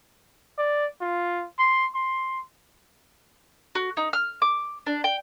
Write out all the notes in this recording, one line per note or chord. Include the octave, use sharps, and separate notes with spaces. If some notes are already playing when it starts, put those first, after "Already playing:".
D5
F4
C6
C6
F#4
D#4
F6
D6
D4
G5